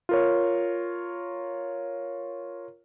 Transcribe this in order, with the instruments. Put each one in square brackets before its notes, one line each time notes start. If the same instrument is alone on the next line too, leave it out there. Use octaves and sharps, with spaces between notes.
[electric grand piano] F4 A#4 C#5